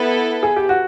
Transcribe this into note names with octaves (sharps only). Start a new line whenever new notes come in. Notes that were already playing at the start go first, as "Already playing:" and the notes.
Already playing: B3 E4 A4
G#4
G4
F#4